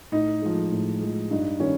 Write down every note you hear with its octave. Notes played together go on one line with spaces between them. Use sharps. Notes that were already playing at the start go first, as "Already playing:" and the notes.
A2 D#4
F3 G#3
A2
F3 G#3
G2 D#4
D#3 G3 C#4